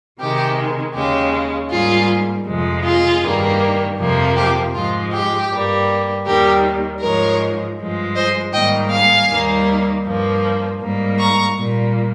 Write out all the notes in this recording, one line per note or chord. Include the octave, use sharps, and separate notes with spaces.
C3 D#3 G#3 G4
D#2 C#3 G#3 G4
G#2 G3 A#3 F4 G#4
F2 C3 F3 G#3
F4 G#4
G2 D#3 G3 A#3
F2 C3 F3 A#3
G4
G#2 F3 G#3 F4
G4
G2 G3 A#3
D#2 D#3 G3 G4 A#4
G#2 F3 G#3 A#4 C#5
G2 F3 G#3
C5 D#5
G#2 D#3 G3 A#3 D#5 G5
F5 G#5
D#2 D#3 G3 A#3
G2 F3 A#3
G#2 G3 A#3
A#5 C#6
A#2 G3 A#3